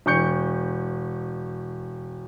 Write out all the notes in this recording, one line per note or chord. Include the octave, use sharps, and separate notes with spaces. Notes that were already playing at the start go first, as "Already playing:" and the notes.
E1 D4 C#6 G6 C#7